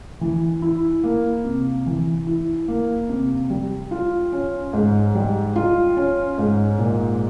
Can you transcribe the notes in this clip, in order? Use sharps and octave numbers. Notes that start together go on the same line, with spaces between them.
E3
E4
A#3
C3
E3
E4
A#3
C3
G3
F4
C#4
G#2
G3
F4
C#4
G#2
A#2